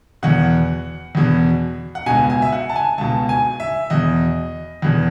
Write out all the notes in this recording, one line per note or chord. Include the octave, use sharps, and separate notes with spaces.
E2 B2 F#5
E2 B2
F#5
C#2 B2 G#5
G#5
E5
F#5
A5
G#5
C#2 B2 A5
G#5
E5
E2 B2 D#5
E2 B2